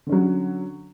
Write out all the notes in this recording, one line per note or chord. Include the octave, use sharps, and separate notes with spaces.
D3 F#3 C#4